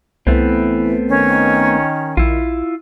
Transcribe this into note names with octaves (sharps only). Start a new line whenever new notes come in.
C2 E3 A3 B3 C4 E4
D#3 C#4
A#1 E4 F4